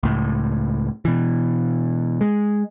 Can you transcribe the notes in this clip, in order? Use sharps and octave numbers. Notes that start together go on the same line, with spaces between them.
C#2 A2
B2 E3
G#3